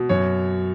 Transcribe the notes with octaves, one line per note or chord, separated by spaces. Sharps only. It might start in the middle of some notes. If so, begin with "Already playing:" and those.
Already playing: B2
F#2 C#5